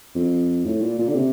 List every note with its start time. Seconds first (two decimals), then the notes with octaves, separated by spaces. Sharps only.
0.15 F2
0.65 A2
0.82 A#2
0.98 A#2
1.09 D3
1.15 C3